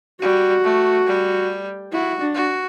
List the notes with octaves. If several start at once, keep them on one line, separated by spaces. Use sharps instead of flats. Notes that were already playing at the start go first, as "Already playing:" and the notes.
G3 F#4
A3
G3
E4 F#4
D4
F#4